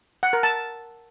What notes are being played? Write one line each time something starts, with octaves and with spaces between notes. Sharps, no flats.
F#5
A#4
A5